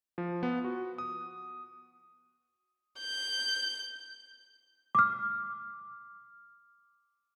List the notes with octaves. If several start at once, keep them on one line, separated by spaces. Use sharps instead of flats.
F3
B3
F#4
D#6
G6
D6 F6